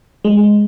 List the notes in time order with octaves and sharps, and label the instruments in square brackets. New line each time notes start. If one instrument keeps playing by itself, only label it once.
[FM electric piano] G#3